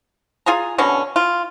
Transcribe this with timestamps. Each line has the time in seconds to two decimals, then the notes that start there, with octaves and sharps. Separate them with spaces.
0.46 F4 G#4 G#5 A#5
0.78 B2 D3 C#4
1.16 F4